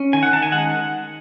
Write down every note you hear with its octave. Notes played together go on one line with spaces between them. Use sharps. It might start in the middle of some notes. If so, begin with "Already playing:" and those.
Already playing: C#4
D#3 G#5
F#5
D#3 A5
G#5
G#3 F#5